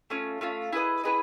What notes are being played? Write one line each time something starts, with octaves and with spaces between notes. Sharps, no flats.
A3 C#4 F4
A3 C#4 F4
E4 G#4 B4 D#5
E4 G#4 B4 D#5